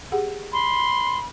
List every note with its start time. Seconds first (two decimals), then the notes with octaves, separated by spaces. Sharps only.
0.12 G4 G#4 F#5
0.53 B5 C6